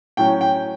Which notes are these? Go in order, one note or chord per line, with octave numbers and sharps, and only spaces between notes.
A2 F#3 C#4 G5
G5